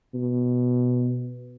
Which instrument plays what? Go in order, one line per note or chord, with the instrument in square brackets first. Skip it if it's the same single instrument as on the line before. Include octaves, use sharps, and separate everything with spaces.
[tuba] B2